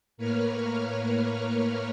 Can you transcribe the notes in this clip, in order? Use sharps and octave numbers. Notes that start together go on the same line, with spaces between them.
A2 A#3 A#4 B4 C#5 F6